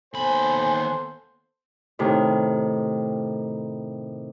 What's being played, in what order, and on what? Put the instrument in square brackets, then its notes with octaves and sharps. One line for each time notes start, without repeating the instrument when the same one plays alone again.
[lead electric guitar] D#2 B5 [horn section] B3 A4 C5 [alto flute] G#5
[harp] A2 C3 D#3